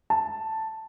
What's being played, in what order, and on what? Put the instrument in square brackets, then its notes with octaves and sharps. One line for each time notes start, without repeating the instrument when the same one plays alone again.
[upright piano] A5